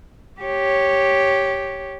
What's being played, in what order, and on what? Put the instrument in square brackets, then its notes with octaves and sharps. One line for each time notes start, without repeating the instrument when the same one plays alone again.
[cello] G4 C#5